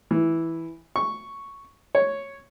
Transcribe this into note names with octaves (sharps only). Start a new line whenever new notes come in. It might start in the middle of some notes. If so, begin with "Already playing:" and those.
E3
C#6
C#5